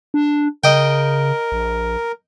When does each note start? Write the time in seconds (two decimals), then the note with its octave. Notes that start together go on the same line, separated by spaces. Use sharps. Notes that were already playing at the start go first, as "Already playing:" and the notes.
0.14 D4
0.64 C#3 A#4 D#5 G5
1.52 A#1